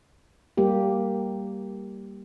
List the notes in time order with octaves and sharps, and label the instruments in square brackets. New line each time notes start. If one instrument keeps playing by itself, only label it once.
[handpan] G3 A#3 G4